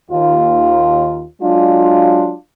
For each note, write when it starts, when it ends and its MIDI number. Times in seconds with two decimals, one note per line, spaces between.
0.10 1.23 39
0.10 1.23 65
1.41 2.33 54
1.41 2.33 56
1.41 2.33 62
1.41 2.33 65